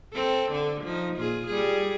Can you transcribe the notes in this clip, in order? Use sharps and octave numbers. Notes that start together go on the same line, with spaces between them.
C4 A4
D3 A4
F3 D#4
A#2 F4 G#4
G3 G#4